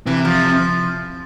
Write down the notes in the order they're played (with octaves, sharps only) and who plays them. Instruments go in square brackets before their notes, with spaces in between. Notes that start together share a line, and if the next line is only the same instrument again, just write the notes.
[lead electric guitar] C3 [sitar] E3
[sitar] F3